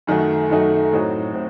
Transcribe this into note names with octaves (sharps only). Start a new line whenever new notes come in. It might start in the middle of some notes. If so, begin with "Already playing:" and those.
F#2 D#3 A3 D#4 F#4
F#2 D#3 A3 D#4 F#4
A2 F#3 C4 D#4 F#4
A2 C4